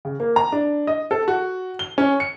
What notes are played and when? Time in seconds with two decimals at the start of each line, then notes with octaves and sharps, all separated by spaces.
0.05 C#3
0.20 A#3
0.36 A#5
0.52 D4
0.87 D#5
1.11 A4
1.28 F#4
1.79 G7
1.98 C#4
2.20 C#7